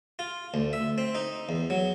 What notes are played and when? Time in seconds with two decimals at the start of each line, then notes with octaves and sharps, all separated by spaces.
0.19 F4
0.54 D2
0.73 E5
0.98 C4
1.15 D#4
1.49 E2
1.70 F#3